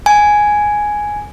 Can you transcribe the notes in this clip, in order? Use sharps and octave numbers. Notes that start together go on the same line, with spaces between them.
G#5